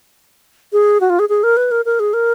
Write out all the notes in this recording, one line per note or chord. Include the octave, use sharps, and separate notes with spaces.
G#4
F#4
F4
G#4
G#4
A#4
B4
A#4
A#4
G#4
A#4